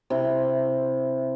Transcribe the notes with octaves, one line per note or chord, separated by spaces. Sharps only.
C3 E4